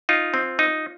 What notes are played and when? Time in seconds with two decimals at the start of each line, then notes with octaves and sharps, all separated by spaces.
0.09 D#4 F4
0.34 C4
0.59 D#4